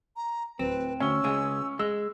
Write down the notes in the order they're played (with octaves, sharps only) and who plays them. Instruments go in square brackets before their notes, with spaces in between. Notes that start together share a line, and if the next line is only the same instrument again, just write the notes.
[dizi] A#5
[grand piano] D1 [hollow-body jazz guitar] C4 [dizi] B4
[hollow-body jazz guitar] D2 [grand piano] C#4 G7 [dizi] E6
[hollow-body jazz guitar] C#2 G#3 G#4
[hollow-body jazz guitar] G#3 [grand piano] E6